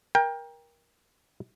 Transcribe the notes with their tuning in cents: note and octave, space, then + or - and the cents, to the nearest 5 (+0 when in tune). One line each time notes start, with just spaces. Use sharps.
A#4 +20 G5 +20